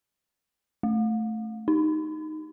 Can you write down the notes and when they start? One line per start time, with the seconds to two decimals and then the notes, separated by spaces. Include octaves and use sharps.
0.83 A3
1.68 D#4